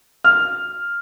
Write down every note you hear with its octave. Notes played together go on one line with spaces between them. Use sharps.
F6